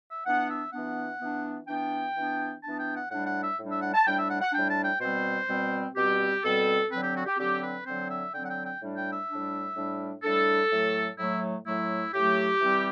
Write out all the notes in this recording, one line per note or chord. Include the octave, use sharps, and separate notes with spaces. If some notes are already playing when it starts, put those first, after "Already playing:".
E5
E3 B3 D4 F#5
E5
E3 B3 D4 F#5
E3 B3 D4
E3 B3 D4 G5
E3 B3 D4
E3 B3 D4 A5
G5
F#5
A2 G3 D4 F#5
F#5
E5
A2 G3 D4
E5
F#5
A5
A2 G3 D4 G5
E5
F#5
F#5
A2 G3 D4 G5
A5
G5
B2 G3 C4 C5
B2 G3 C4
B2 G3 C4 G4
B2 G3 C4 A4
D3 F#3 C4 B4
G4
F#4
G4
D3 F#3 C4 G4
B4
D3 F#3 C4 C5
E5
D3 F#3 C4 G5
F#5
G5
G5
A2 G3 D4
G5
E5
A2 G3 D4
A2 G3 D4
A2 G3 D4 A4
A2 F#3 A3
A2 F#3 A3 E4
A2 F#3 A3 E4
A2 F#3 A3 G4
E3 G3 C4